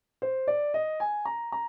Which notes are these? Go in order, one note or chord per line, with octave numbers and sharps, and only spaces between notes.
C5
D5
D#5
G#5
A#5
A#5